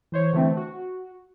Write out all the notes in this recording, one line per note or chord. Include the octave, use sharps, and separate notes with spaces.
E3 C5 C#5
D3 E3 A3 C4
F#4